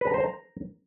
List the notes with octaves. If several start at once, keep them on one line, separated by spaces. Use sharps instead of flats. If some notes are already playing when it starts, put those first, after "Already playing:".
B4
A#5
C5
A#5